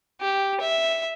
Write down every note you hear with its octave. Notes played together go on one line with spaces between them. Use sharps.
G4
E5